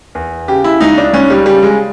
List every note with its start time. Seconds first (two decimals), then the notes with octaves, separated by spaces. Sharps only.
0.15 E2
0.48 C#3 G4
0.64 E4
0.81 C#2 D#4
0.98 D4
1.13 C#2 C#4
1.30 G3
1.46 C#3 G3
1.63 G#3